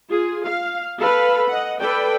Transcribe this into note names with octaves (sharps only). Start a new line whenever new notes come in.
F4 G#4
F5
A4 B4 F5 B5
D#5 F#5
A4 B4 D5 G5